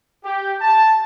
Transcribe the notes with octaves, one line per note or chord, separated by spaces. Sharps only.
G4
A5